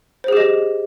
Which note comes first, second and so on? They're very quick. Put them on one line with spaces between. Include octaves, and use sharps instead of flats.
C5 G#4 G4 D#5